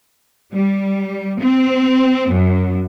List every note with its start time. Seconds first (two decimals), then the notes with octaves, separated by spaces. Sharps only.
0.54 G3
1.42 C4
2.32 F#2